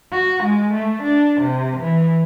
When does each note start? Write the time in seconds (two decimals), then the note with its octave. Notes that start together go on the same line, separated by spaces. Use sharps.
0.12 F#4
0.44 G#3
0.74 A3
1.03 D4
1.41 C3
1.80 E3